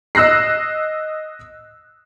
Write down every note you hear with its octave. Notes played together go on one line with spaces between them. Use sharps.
D#5 E6 F#6 A#6 C7